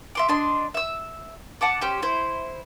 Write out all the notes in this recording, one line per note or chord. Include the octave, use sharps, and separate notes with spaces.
E5 C6 D6
D4 D#5 C6
E5 E6
F#5 A5 D6
C#4 G4 C5
E4 C5